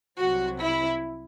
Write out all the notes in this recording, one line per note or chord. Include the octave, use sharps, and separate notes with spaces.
C2 C3 F#3 F#4
E4